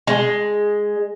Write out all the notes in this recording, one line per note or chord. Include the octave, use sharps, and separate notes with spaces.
G#3